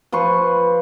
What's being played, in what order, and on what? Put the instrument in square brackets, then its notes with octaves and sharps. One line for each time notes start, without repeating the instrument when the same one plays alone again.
[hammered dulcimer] F3 B4 C6 C#6